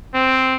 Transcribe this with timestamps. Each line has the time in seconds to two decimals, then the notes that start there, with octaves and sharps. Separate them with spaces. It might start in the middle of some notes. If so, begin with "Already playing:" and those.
0.14 C4